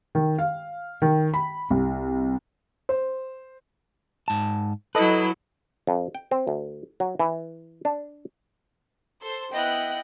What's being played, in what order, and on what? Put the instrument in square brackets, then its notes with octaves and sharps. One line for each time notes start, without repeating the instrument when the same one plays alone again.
[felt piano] D#3
F5
D#3
B5
C2
C5
[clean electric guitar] G#2 A5
[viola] F#3 E4 [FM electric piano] A4 D#5 [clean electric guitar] B4
[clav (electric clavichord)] F2
G5
C4
D2
F#3
E3
D4
[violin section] A4 C5 C6
[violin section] B3 F#6 [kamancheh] E4 D#5 [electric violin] G5